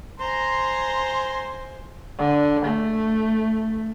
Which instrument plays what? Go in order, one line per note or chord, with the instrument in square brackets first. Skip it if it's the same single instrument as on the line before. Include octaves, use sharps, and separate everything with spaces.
[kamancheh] C5 G#5 [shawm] A#5 [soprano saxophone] C6
[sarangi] D3
A3